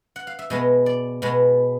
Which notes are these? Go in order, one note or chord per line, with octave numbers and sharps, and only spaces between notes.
F#5
F5
E5
B2 G#3 B3 D#5
D5
B2 G#3 B3